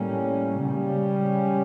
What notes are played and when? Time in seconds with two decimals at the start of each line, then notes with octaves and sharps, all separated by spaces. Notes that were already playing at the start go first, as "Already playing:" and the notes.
Already playing: A2 G3 A#3 C#4
0.65 C#3 G3 C#4